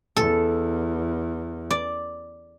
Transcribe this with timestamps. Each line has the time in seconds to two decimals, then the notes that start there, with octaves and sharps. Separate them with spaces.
0.17 E2 A4
1.71 D5